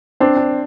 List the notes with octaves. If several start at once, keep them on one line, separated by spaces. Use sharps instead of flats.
C4 D4
D4